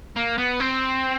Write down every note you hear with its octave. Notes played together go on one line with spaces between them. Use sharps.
A#3
B3
C4